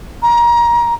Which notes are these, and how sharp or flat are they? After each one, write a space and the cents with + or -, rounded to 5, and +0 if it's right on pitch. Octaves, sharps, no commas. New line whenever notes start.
A#5 +25